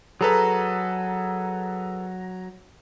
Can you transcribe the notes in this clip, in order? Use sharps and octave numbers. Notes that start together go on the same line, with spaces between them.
F#3 G#4 A4 B4 A#5